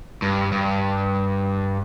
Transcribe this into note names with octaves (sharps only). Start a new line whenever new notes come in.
G2
G2